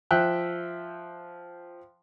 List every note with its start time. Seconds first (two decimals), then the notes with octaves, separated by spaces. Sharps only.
0.11 F3 E5 G5 F#6